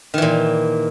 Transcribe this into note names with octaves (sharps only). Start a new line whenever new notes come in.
A#2 D#3 E3